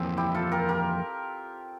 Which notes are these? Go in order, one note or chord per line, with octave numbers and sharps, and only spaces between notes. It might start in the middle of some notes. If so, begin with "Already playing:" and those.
Already playing: F2 E3 A#3 C4
E4 G4
F4 A4
G4 A#4
G4 A#4